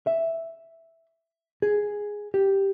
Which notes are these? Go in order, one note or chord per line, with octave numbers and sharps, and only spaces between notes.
E5
G#4
G4